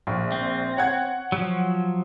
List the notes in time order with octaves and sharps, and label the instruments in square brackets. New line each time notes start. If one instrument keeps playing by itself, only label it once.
[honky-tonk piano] A#1
[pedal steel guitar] C4
[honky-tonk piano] C#5 F#5 G#6
[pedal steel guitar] F3 F#3